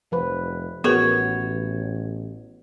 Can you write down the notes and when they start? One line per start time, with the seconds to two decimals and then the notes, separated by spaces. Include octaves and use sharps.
0.12 F1 F3 B4
0.84 A1 B3 F#4 G#4 A#4 B4 C#5